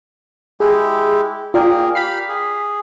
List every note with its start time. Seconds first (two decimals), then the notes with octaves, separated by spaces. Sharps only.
0.60 G#3 E4 G4 G#4
1.54 A#3 F4 G#4 A#4 D5 G5
1.95 G4 F5 B5 B6 C7
2.29 G#4